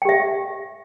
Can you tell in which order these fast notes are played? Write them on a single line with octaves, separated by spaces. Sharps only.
G5 G4 E5